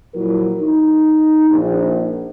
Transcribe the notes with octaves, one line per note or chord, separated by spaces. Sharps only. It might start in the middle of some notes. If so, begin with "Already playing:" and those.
A#2 F3 F#3 E4 A#4
D#4
A#1